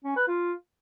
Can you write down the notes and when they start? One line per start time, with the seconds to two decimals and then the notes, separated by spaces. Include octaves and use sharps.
0.04 C#4
0.16 B4
0.28 F4